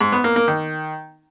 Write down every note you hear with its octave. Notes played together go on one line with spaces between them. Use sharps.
G#2
B3
A#3
A#3
D#3